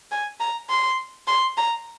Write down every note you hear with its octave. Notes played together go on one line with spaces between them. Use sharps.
G#5
A#5
C6
C6
A#5